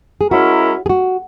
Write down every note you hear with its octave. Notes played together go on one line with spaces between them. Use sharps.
G#4
G#3 C#4 E4 F#4 A#4
G#4
F#4